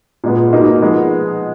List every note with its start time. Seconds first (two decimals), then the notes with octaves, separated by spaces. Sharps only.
0.24 A#2 G#3 B3
0.53 B2 A#3 D#4
0.82 F3 G#3 B3